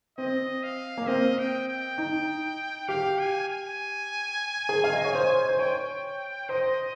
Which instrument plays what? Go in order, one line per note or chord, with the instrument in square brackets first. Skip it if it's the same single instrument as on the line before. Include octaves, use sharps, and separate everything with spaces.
[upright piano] C4 [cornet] D#5
[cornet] F5
[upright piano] A#3
[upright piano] C4 [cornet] D#5
[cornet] G5
G5
[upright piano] D#4
[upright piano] G4 [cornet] F5
[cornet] G#5
G#5
[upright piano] G#4
F5
D#5
C#5
C5
C5
[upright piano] C#5 [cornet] G5
[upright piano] C5 [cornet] D#5